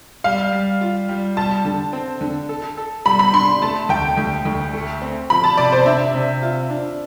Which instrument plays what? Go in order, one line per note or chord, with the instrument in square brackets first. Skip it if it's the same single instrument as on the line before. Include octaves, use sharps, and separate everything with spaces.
[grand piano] G3 [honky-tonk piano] F5
[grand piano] G3
F4
G3
[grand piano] G3 [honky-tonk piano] A5
[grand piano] D3
C4
D3
A4
A4
[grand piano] G3 [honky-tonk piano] B5
[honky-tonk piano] B5
[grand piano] D4 [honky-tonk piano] C6
[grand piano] A3 [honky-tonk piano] A5
[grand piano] D2 [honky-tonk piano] G5
[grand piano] D2
D2
A3
C4
[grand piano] F3 [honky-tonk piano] B5
[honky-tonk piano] A5
[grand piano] C3 [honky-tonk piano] D5
[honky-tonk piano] C5
[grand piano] D4 [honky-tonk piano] E5
[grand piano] C3
F4
D4